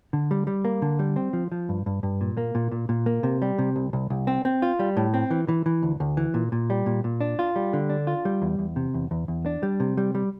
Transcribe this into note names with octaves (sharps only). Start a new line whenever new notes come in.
D3
G3
G3
A#3
D3
G3
C4
F3
F3
G2
G2
G2
A#2
A#3
A#2
A#2
A#2
A#3
C3
G3
C3
C2
C2
C2
C4
C4
F4
G3
A2
C4
E3
E3
E3
D2
D2
E3
A#2
A#2
G3
A#2
A#2
D4
F4
G3
D3
D4
F4
G3
E2
E2
C3
E2
E2
E2
D4
G3
C3
G3
G3